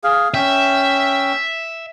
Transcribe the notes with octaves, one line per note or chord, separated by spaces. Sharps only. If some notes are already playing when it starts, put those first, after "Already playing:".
G#4 F5
C#4 E5 G5